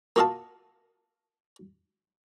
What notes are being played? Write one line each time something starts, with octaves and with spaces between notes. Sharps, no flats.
A#3 F4 F#4 D#5 F5 A5